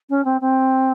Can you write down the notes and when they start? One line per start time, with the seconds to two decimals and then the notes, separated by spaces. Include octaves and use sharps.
0.10 C#4
0.25 C4
0.41 C4